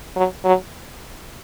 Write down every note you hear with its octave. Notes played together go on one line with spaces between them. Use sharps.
F#3
F#3